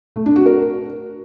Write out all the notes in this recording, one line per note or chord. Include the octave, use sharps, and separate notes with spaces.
A3
D4
F#4
A#4